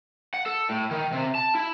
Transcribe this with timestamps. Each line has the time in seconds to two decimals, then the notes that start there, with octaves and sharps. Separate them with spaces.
0.34 F#5
0.46 A4
0.69 A2
0.91 D#3
1.12 C3
1.35 A5
1.55 E4